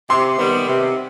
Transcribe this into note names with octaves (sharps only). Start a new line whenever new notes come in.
C3 C6
D#3 G3 B3
C3